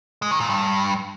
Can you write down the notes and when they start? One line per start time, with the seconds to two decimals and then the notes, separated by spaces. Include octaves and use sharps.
0.22 G#3
0.31 D#3
0.40 A#2
0.49 G2